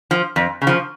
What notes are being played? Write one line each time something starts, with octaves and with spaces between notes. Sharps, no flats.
F3
F2
C#3
F3